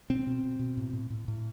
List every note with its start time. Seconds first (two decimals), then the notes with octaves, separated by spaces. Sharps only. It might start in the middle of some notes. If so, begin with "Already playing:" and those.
0.10 B2 C4
0.27 B2
0.44 B2
0.59 B2
0.77 A2
0.93 A2
1.10 A2
1.28 A2